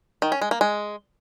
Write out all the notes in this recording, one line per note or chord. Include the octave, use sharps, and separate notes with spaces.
D#3
C#4
G#3
A#3
G#3